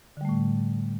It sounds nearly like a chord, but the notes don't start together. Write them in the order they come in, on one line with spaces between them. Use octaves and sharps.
D3 G3 A3 A2